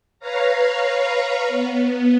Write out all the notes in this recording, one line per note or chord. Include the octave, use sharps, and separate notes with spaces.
B4 C#5 F5 A#5
B3